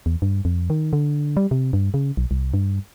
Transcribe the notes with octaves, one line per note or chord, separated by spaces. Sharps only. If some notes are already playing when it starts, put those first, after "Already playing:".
E2
G2
F2
D#3
D3
G3
C3
G2
C#3
B1
C2
G2